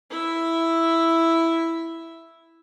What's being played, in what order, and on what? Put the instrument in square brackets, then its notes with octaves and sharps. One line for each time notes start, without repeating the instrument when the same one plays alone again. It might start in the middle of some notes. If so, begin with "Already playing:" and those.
[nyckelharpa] E4 E5